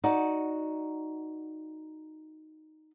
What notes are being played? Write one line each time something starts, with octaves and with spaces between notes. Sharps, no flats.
D#4 F#4 D5